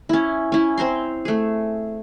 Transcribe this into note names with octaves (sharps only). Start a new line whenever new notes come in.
C#4 E4
C#4 E4
C4 C5 A#5 C6
A3 G#4